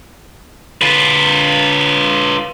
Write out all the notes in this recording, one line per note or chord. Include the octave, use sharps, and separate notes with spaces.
F4 B4